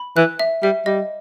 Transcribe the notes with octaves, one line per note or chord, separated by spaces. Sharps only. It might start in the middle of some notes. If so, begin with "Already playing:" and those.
Already playing: B5
E3 F#6
E5
G3 E5
G3 D#5